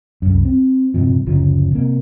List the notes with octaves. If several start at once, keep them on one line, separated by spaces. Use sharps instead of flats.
C2 F#2
C4
D#1 G2 C3 F3
F#1 D2 C#3 F3
C3 A#3